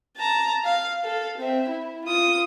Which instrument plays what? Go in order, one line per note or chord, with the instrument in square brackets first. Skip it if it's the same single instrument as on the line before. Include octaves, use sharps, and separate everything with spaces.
[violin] A5 A#5
F5
A4 F5
C4 E5
E4
F4 D#6